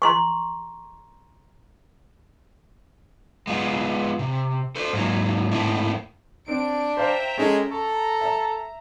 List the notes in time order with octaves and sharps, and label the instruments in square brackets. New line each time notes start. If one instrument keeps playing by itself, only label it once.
[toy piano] A#5 C6 C#6
[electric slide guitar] G#3 B3 F4
C3
A4 C5
G#2 F#3 A#3
G#2 A3 A#3 C4 E4
[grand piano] C4 [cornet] D4 [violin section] D7
[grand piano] C5 F5 [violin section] E5 G5 A#5
[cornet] G#3 [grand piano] C#4 G#4 A4
[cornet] A4 [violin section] A#5 [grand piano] C#6
[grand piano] E5 E6